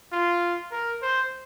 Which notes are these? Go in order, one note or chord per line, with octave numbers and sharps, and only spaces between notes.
F4
A#4
C5